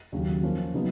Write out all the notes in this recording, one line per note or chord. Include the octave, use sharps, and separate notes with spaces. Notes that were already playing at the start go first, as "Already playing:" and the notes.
D#2 C#3 F#3
F3 A#3 C#4
C#3 F#3 B3 D#4